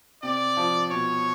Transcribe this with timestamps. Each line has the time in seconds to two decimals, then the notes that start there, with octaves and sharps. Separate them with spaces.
0.22 C3 D5
0.57 F3
0.90 B2 C#5